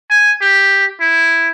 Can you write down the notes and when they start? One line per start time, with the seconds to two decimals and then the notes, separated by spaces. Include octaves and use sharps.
0.11 G#5
0.42 G4
1.01 E4